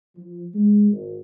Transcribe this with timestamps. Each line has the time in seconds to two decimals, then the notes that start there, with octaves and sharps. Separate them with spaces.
0.16 F3
0.55 G#3
0.92 G#1